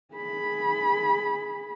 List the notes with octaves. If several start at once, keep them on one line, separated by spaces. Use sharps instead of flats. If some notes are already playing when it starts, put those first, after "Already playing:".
G#4 B5